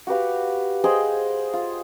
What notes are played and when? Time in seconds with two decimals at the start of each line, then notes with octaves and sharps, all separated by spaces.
0.07 F#4 G4 B4 F5
0.84 G#4 C5 D#5 G5
1.53 F4